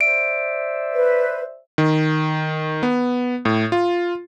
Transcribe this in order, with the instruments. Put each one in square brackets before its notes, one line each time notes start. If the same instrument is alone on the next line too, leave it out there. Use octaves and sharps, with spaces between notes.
[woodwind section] C5 D5 E5 [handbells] D7
[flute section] B4
[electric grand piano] D#3
B3
A2
F4